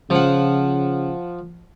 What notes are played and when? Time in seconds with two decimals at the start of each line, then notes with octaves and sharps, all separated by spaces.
0.10 C#3 F3 F#5